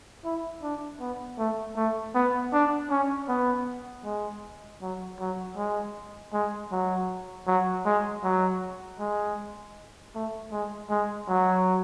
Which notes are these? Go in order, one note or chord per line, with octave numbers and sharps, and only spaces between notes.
E4
D4
B3
A3
A3
B3
D4
C#4
B3
G#3
F#3
F#3
G#3
G#3
F#3
F#3
G#3
F#3
G#3
A3
G#3
G#3
F#3